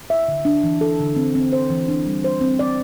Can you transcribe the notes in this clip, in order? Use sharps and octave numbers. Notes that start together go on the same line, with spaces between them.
E5
D3
D4
E3
A4
D3
C4
C4
C5
E3
D4
G3
C5
C4
D5